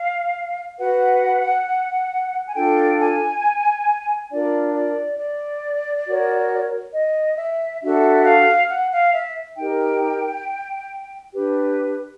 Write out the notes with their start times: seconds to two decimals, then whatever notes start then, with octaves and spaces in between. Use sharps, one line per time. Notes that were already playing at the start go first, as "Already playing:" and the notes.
Already playing: F5
0.79 F#4 B4 F#5
2.46 G#5
2.55 D4 F4 A4 G5
2.99 G#5
4.31 D4 F4 A#4 D5
4.75 D5
5.18 D5
6.06 F#4 A#4 C#5
6.94 D#5
7.39 E5
7.82 D4 F#4 A4 E5
8.25 F5
8.70 F#5
8.92 F5
9.14 E5
9.57 D#4 G4 A#4 G5
11.33 D4 G4 B4